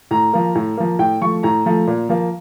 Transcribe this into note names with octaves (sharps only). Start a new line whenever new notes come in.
A2 A#5
F3 A#3
A2
F3 A#3
A2 G5
F3 A3 C#6
A2 A#5
F3 A3
A#2
F3 A#3